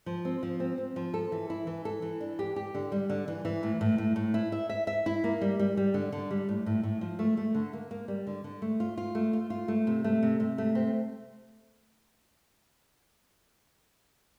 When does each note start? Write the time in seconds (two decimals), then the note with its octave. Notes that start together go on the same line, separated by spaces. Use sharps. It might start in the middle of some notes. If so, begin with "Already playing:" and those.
0.06 F3
0.25 C4
0.43 F3
0.60 C4
0.78 C4
0.96 F3
1.14 A4
1.32 E3
1.50 E4
1.67 E3
1.85 A4
2.02 E3
2.21 D4
2.39 G4
2.56 G4
2.75 D3
2.92 G3
3.10 D3
3.28 E3
3.45 E3
3.63 A2
3.81 A2
3.98 A2
4.16 A2
4.34 E4
4.52 E5
4.69 E5
4.87 E5
5.06 E4
5.24 A#3
5.41 G3
5.60 G3
5.77 G3
5.94 D3
6.12 D3
6.31 G3
6.49 A2
6.66 A2
6.83 A2
7.01 F3
7.19 A3
7.37 A3
7.55 D3
7.73 A#3
7.91 A#3
8.08 G3
8.27 D3
8.44 D3
8.62 A3
8.80 F4
8.97 F4
9.15 A3
9.33 F4
9.50 F4
9.68 A3
9.87 C3
10.04 A3
10.23 C3
10.40 C3
10.58 A3
10.75 C4